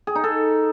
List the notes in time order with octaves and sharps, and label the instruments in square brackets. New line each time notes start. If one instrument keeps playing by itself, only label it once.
[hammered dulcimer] G#4
D#4
A4